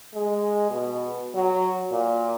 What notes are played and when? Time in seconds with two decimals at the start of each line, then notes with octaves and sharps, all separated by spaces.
0.14 G#3
0.70 B2
1.34 F#3
1.92 A#2